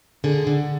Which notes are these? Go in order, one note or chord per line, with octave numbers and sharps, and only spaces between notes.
D3 G#4
D3